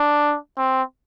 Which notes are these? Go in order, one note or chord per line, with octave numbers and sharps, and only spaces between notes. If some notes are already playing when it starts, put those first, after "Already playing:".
Already playing: D4
C4